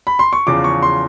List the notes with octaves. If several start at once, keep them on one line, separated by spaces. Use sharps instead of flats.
B5
C6
C#6
E2 C#3 F3 D6
C#6
C6